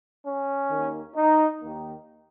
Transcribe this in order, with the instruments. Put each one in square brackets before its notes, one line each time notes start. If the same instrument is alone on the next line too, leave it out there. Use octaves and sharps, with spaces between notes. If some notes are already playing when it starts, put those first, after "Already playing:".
[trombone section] C#4
D#2 D#3 A#3
D#4
D#2 D#3 A#3